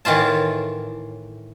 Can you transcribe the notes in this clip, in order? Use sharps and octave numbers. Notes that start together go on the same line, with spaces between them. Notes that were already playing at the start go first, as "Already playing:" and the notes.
A2 D#3 E3 F4 A5